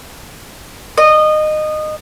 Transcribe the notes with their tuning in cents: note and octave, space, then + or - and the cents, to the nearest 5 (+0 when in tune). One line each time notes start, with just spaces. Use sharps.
D#5 -20